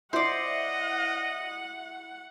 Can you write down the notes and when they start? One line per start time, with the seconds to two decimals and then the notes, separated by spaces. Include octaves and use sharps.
0.13 E4 C5 D5 D#5 F#5